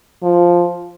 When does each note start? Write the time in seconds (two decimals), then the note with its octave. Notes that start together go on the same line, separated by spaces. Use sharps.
0.23 F3